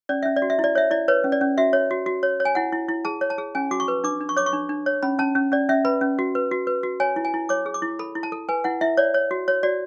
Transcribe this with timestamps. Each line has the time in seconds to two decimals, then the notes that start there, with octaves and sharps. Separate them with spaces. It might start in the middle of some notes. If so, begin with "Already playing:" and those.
0.09 C#4 D5
0.23 C#4 E5
0.36 D5
0.42 F#4
0.50 E5
0.59 E4
0.64 D5
0.75 C#5 E5
0.91 E4 D5
1.08 B4 C#5
1.24 C#4
1.32 D5
1.41 C#4
1.58 F#4 E5
1.73 C#5
1.91 F#4
2.06 F#4
2.23 C#5
2.40 C#5
2.45 G#5
2.55 E4 F#5
2.72 E4
2.89 E4
3.05 G#4 A5
3.21 C#5
3.30 A5
3.38 G#4
3.55 C#4 G#5
3.71 F#4 D6
3.80 C#6
3.88 B4
4.04 D4 D6
4.21 D4
4.29 C#6
4.37 C#5 D6
4.46 C#6
4.53 D4
4.69 D4
4.86 C#5
5.03 C#4 B5
5.19 C#4 A5
5.35 C#4
5.52 C#4 D5
5.69 C#4 E5
5.85 B4 B5
6.01 C#4
6.19 F#4
6.35 B4
6.51 F#4
6.67 B4
6.83 F#4
7.00 C#5 G#5
7.16 E4
7.25 G#5
7.34 E4
7.49 C#5 D6
7.66 G#4
7.74 D6
7.82 E4
7.99 A4 B5
8.15 E4
8.23 A5
8.32 A4
8.49 B4 G#5
8.64 E4 F#5
8.81 E4 E5
8.97 C#5 D5
9.14 C#5
9.31 F#4
9.48 C#5
9.63 F#4 D5